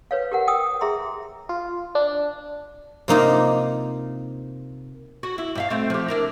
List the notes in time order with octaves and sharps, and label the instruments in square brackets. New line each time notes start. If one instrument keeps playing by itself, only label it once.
[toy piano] B4 C#5 F5
G4 A#4 F#5
G5 D#6 E6
G#4 E5 A#5 C6
[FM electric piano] F4
D4
[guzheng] C3 A#3 D#4 F4
[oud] F#4
E4
G2 E5 F5
A3 C4
F3 G4
D4 E4 A#4